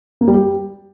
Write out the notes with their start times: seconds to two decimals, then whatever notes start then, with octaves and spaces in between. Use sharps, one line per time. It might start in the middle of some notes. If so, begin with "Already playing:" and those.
0.21 A#3
0.28 G3
0.34 G4